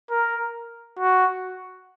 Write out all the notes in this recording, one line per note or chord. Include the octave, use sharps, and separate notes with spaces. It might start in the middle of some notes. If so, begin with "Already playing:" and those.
A#4
F#4